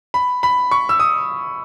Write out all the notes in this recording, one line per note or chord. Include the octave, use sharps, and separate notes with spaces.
B5
B5
C#6
E6
D#6